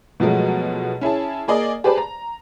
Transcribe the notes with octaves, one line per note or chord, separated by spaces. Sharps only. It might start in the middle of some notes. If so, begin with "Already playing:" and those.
B2 F3 F#3 G#3 A3
C#4 E4 G#4 A5
A#3 G#4 D5 D#5
G4 G#4 B4 C5 D5 A5
A#5